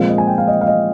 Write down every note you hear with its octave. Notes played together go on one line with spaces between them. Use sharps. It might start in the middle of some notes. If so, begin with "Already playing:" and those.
Already playing: A#2 F3 G#3 C4 F5
D#5
G#5
G5
F5
D#5
F5
D#5